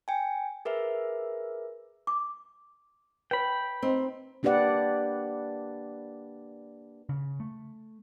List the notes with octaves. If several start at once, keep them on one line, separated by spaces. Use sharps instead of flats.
G5 G#5
G#4 A#4 B4 E5
D6
B4 C#5 G5 B5
C4 D#4
A#3 D4 G4 B4 D5 F#5
C#3
A3